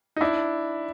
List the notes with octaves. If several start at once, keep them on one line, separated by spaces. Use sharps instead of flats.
D#4
D4 E4